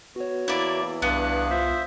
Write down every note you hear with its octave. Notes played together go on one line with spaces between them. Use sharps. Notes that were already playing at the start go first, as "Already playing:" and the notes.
B3 F#4 C#5
E2 A#3 E4 D5
C2 G2 B3 F5 F#6
F4 C5 E5